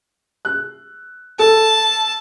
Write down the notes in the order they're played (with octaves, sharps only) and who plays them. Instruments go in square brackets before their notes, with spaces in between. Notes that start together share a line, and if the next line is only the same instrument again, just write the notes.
[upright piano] F#6
[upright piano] A4 [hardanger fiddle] A5